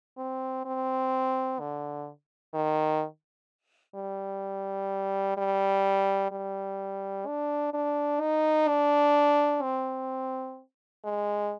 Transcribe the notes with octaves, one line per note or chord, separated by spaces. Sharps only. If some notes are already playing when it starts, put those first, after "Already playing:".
C4
C4
D3
D#3
G3
G3
G3
D4
D4
D#4
D4
C4
G#3